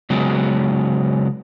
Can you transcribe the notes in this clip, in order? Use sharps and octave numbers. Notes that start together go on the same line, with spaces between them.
C#3 F#3 G#3 B3